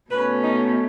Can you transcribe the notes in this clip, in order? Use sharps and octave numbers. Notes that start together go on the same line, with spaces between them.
B2 A3 C#4 B4
D#4